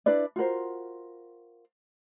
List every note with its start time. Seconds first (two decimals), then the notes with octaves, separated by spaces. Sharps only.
0.06 D4 E4 B4 D5
0.36 F4 F#4 A#4 C5